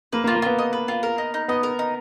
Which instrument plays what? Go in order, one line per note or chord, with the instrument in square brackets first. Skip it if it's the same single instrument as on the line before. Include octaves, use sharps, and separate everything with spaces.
[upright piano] A#3 [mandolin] B4
[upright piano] A#3
[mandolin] F4
[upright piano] A#3
[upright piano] B3 [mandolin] F4
[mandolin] D#5
B4
F4
A#4
D#4
D#4
[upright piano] B3 [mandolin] D#5
[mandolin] A#4
D#4